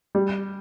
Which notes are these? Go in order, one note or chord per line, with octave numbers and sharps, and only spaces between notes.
G3